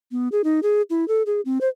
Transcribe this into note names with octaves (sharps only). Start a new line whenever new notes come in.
B3
G#4
D#4
G#4
E4
A4
G#4
C4
C5